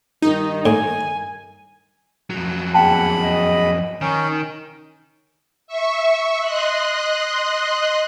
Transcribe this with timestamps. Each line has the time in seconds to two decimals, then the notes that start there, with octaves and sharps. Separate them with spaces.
0.22 G2 D#3 D#4
0.66 A2 G#5
2.30 F2 F#3
2.74 E2 A#3 C#4 F#5 G5 A5 B5
3.23 D#5
4.01 D#3 C#4 D#4
5.67 E5 C#6
6.40 D#5 C6 F#6